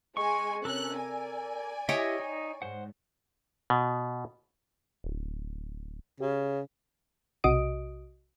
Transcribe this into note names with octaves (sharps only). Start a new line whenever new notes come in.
G#3 G#5 C#6
C3 C#4 A4 A#4 E6 F#6
D5 G#5
E4 G4 C#5 D#5 E5 G5
D#4
G#2 C5 F#5
B2
D1
C#3 G4
B1 C3 F#4 D#5 D#6 D7